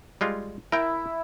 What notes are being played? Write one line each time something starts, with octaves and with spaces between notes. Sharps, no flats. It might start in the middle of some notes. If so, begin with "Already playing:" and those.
G3 G#3 F4
E4 A#4 G5